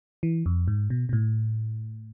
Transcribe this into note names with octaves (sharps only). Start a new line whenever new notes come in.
E3
F2
G#2
B2
B2
A2